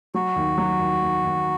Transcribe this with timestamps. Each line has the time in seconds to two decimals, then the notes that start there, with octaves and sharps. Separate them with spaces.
0.14 F#3 F#4
0.36 D#2
0.58 F#3
0.80 D#2
1.02 D#2
1.24 D#2